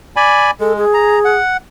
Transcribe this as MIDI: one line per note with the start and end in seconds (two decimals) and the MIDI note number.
0.16 0.51 74
0.16 0.51 80
0.16 0.51 83
0.60 0.85 56
0.60 0.74 69
0.76 1.37 68
0.94 1.19 82
1.25 1.57 78